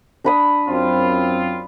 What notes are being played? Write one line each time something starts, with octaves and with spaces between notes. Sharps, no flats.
D4 B5 D#6
F#2 C4 F4